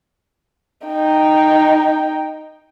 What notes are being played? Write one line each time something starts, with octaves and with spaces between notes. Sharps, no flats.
D#4 G5